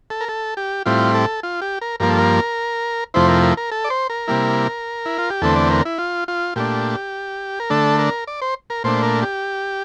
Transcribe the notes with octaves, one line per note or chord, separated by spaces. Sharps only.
A4
A#4
A4
G4
A2 G3 C4 E4 F4
A4
F4
G4
A#4
G2 F3 A#3 A#4
A4
A#4
F2 C3 F3 A3 E4 C5
A#4
A#4
A#4
A4
D5
C5
A#4
C3 G3 A#3 E4
E4
F4
G4
E2 D3 A3 C4 A4
D5
A#4
E4
F4
F4
A#2 A3 D4 G4
A#4
D3 A3 D4 A4
A#4
D5
C5
A#4
A#2 A3 D4 C5
A#4
G4